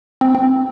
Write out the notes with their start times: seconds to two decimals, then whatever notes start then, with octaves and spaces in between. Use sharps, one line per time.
0.21 C4
0.35 C4